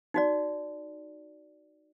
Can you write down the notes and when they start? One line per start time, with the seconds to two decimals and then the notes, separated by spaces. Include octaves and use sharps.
0.14 D#4 F#4 D5